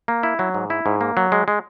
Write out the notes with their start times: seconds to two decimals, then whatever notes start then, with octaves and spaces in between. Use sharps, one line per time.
0.08 A#3
0.23 E4
0.39 F#3
0.54 G#2
0.70 E4
0.86 G#2
1.01 A#3
1.17 F#3
1.32 G#3
1.48 G#3